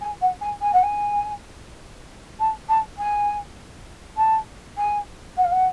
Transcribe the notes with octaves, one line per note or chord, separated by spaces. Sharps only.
G#5
F#5
G#5
G#5
F#5
G#5
A5
A5
G#5
A5
G#5
F#5
F5
F#5